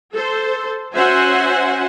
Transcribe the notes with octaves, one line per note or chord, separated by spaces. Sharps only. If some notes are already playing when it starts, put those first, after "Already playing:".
A4 C5
C#4 F#4 C5 E5 F#5 G#5